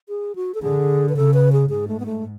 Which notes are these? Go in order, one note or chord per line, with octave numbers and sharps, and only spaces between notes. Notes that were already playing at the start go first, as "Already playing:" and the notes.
G#4
F#4
A4
D3 G#4
B4
C#3 A4
B4
G#4
G#2 G#4
A3
B3
A3